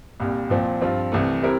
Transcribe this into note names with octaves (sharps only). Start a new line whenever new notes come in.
C2 A#2 G3
C2 A#2 F3 C4
G2 F3 C4 F4
C2 C3 E3 A3
C3 G3 C4 E4 A#4